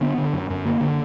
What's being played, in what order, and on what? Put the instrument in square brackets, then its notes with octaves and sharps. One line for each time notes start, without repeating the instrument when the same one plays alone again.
[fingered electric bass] D3 B3
D3
F#2
F#2
D3 A#3
D3